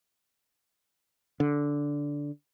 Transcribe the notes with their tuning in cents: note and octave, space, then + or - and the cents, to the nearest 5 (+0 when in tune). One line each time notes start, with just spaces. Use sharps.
D3 -10